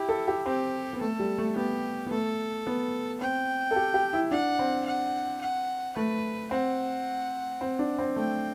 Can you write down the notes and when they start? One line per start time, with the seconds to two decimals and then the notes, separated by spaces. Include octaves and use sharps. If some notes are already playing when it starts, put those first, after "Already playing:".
Already playing: E4 G4
0.09 A4
0.28 G4
0.46 C4 G4
0.93 B3
1.01 A3 A4
1.19 G3
1.38 A3
1.56 B3 G4
2.06 B3
2.11 A3 A4
2.67 B3
3.21 C4 G5
3.71 A4
3.76 G4
3.94 G4
4.13 E4
4.31 D4 F#5
4.59 C4
4.86 F#5
5.41 F#5
5.96 A3 B4
6.51 C4 F#5
7.61 C4
7.79 D4
7.99 C4
8.16 A3 G5